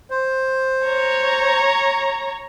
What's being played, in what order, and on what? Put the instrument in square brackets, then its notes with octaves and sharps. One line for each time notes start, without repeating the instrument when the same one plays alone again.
[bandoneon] C5
[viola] C#5 A#5